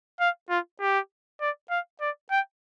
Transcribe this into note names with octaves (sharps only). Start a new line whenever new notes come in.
F5
F4
G4
D5
F5
D5
G5